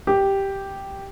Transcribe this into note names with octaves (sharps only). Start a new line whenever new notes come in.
G4